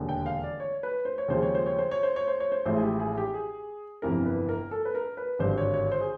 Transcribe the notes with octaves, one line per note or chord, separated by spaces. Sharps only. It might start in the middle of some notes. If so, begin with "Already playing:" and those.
Already playing: E1 D#2 D3
G5
F5
D5
C#5
B4
C5
C#5
D#2 C#3 F3 G#3 C5
C#5
C5
C#5
C5
C#5
C5
C#5
C5
C#5
C5
A1 A2 F3 G#3 C5
G#4
G4
G#4
G4
G#4
G1 F2 C3 E3 A#4
B4
A#4
A4
B4
A#4
B4
G#1 G2 D3 G3 C5
C#5
C#5
C5
G#4